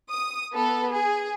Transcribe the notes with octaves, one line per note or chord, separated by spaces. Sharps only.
D#6
B3 A4
G#4